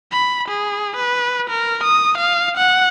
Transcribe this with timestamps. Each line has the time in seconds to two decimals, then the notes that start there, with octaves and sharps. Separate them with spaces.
0.12 B5
0.48 G#4
0.96 B4
1.50 A#4
1.84 D#6
2.18 F5
2.57 F#5